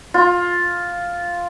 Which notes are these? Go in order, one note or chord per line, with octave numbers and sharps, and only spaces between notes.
F4